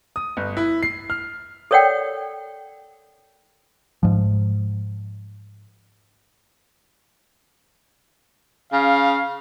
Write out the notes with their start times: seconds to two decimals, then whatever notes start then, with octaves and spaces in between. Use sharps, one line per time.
0.16 D#6
0.37 G1
0.57 E4
0.83 C7
1.10 F6
1.71 A4 A#4 C#5 D5 F#5 G5
4.03 G#2 F3
8.73 C#3 F5